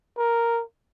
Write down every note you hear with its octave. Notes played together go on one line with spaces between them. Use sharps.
A#4